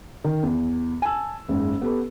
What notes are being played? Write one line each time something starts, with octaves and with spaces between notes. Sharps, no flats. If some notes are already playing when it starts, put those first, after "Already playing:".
D#3
E2
G#5 A5 E6
F#1 G#2
B3 G4 A4 B4